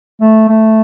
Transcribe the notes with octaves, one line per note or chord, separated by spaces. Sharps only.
A3
A3